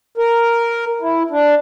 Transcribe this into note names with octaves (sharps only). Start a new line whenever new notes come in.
A#4
E4
D4